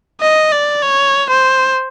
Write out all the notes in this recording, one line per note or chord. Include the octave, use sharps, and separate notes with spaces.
D#5
D5
C#5
C5